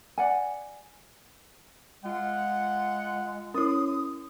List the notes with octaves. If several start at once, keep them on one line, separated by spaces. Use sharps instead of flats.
D5 F#5 G#5
G#3 F4 F#5
C#4 E4 D#6